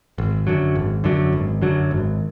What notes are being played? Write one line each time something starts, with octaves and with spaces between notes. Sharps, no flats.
G#1
F#2 D3 F#3
G#1
F#2 D3 F#3
G#1
F#2 D3 F#3
G#1